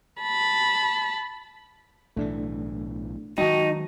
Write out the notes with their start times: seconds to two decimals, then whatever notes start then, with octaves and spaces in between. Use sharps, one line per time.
0.22 A5 B5
2.16 B1 A2 E3 A3 D4
3.38 D#3 F#3 G#3 D#4 F#4 G5 A5